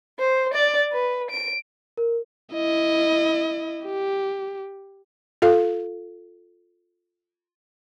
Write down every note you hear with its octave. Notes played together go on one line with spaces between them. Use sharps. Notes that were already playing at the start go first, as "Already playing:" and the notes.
C5
D5
B4
D7
A#4
E4 D#5
G4
F4 A4 F5